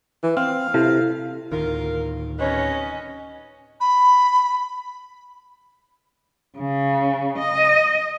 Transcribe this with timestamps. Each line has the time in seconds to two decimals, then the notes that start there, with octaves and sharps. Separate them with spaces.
0.23 E3
0.37 C4 F5
0.74 C3 E4 A4
1.52 D1 D#3 F4 A#4
2.39 C3 C#4 B4 C#5 D#5
3.80 B5
6.58 C#3
7.39 D#5